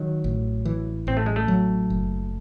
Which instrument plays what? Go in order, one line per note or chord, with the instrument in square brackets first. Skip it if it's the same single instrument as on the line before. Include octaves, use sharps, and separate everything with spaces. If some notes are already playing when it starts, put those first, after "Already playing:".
Already playing: [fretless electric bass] D#3 [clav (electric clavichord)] F#3
[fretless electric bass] A1
E3
[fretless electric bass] A1 [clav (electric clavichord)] C4
[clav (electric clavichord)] A3
G#3
A3
[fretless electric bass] F#3
F#1